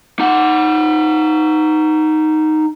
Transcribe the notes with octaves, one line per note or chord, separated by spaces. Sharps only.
D#4 F#5